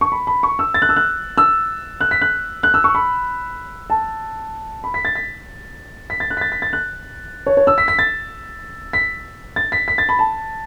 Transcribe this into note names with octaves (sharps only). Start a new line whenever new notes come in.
C#6
B5
B5
C#6
E6
A6
F#6
E6
F#6
E6
F#6
B6
F#6
F#6
E6
C#6
B5
A5
B5
B6
A6
B6
B6
A6
F#6
B6
A6
B6
A6
F#6
C#5
C#5
E6
B6
B6
A6
B6
A6
B6
B6
A6
B5
A5